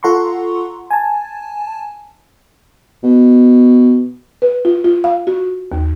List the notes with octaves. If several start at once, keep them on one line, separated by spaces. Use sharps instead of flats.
F4 A4 F#5 A#5 C6 C#6
G#5 A5
B2
B4
F4
F4
F5
F#4
D#2